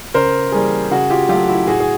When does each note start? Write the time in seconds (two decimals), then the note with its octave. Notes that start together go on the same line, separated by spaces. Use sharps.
0.14 C#3 A#4 C5
0.52 E3 G3 A#3 G#4 A#4
0.91 C#3 F#4 G#4
1.10 F4 G4
1.29 F#3 A3 F4 G4
1.48 E4 F#4
1.67 A2 F#4 G#4
1.80 G#4